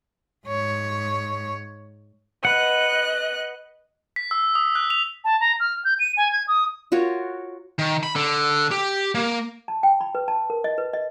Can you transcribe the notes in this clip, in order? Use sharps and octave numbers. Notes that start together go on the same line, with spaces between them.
G#2 C#5
B4 D#5 F#5 F#6
B6
E6
D#6
F#6
F7
A5
A#5
F6
G6
D#7
G#5
G#6
D#6
F4 F#4 A#4 C#5
D#3
B5
D3
G4
A#3
A5
G5
B5
B4
A5
A#4
D#5
B4
D#5